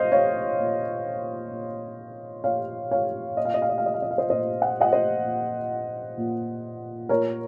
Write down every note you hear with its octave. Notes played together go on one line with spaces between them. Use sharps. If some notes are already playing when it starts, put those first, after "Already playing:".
Already playing: A#2 C5 D#5 F5
C#5 F5
A#2
A#2
A#2 C#5 F5
C#5 F5
A#2 D#5
F5
D#5
F5
D#5
F5
D#5
F5
D#5
F5
C5 D#5
A#2 C5 D#5
F#5
D#5 F#5
C5 D#5
A#2
A#2
A#2 A#4 C#5